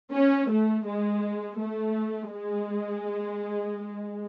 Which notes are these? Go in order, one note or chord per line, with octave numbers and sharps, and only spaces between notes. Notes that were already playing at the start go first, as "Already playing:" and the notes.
C#4
A3
G#3
A3
G#3